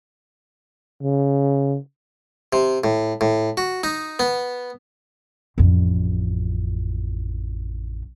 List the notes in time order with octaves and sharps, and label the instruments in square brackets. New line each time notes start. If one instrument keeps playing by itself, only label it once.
[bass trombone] C#3
[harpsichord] C3
A2
A2
F#4
D#4
B3
[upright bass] A1 F2